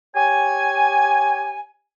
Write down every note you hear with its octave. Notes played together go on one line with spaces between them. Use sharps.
G4 C#5 G#5